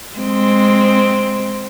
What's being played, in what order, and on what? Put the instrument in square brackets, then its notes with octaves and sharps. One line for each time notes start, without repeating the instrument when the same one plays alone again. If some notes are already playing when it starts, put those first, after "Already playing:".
[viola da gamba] G#3 C4